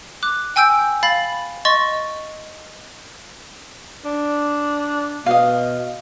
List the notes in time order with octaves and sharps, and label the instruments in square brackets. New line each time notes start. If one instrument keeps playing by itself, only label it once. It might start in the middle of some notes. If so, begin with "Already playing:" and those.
[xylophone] D6 F#6
G5 G#5 E6 G6 D7
F5 B5 A6 F#7
D#5 C6 C#6 A6
[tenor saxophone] D4
[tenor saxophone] B2 [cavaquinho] D#5 F5